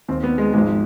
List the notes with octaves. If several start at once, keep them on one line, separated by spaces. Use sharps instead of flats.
D#2 D#3 C4
B3
G#3
G#1 G#2 F3 G#3